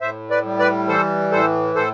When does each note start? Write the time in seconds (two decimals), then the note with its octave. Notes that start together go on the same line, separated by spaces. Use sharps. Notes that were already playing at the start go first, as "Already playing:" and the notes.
0.01 A2 C5 E5
0.30 B4 D5
0.45 G3
0.59 B4 D5
0.88 E3 A4 C5
1.32 A2 A4 C5
1.75 A2 A4 C5